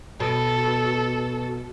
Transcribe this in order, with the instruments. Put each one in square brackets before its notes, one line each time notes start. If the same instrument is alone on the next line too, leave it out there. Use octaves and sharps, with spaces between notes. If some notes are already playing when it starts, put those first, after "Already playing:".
[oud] B2 [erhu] A4